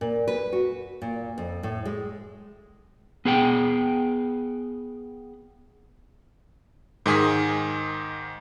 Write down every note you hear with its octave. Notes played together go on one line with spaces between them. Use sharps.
A#2
B4
F#4
A#2
F2
A2
G#3
B3 G#4 F#5 G5
G#2 D#3 G#4 D#6 B6